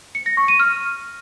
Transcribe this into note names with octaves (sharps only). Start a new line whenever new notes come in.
C#7
A#6
C#6
D#7
F6